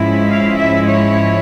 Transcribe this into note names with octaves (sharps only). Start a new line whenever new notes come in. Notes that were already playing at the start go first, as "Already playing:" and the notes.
Already playing: G#2 F3 G#3 C#4 E4
F5
E5
C#5